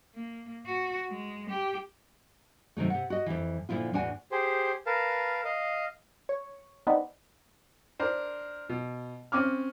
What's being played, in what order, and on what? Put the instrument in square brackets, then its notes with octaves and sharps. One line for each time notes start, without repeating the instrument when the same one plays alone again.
[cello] A#3
F#4
G#3
G4
[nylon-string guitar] C3 D#3 F#3 A3
C3 F#5
F#4 D#5
F2 E3
A#2 D3 F3 E4 F4
E2 A2 D4 F#4 F#5 G#5
[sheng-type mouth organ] G4 G#4 C5
A#4 B4 F5 A5
D#5 F5
[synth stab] C#5
B3 C4 D4 D#4 B4
[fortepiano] D4 A#4 C5
B2
C4 C#4 D6 F6